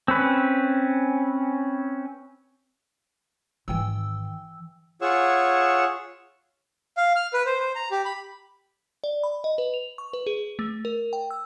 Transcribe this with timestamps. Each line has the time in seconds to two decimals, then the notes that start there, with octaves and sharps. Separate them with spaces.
0.08 C4 C#4 B4
3.68 G#1 D#3 E3 G5 E6
5.01 F4 G#4 C#5 F#5 C#6 E6
6.97 F5
7.16 F6
7.33 B4
7.46 C5
7.60 C5
7.75 A#5
7.91 G4
8.05 B5
9.04 D5
9.23 B5
9.44 D#5
9.58 B4
9.74 F7
9.98 C#6
10.13 B4
10.27 G#4
10.59 A3
10.85 A#4
11.13 G5
11.31 E6